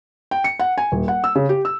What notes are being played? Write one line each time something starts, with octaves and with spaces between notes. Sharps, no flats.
G5
C#7
F#5
G#5
D#1
F#5
E6
C#3
G4
E6